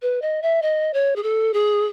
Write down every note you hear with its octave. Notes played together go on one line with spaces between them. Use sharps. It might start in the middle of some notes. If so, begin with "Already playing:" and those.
B4
D#5
E5
D#5
C#5
G#4
A4
G#4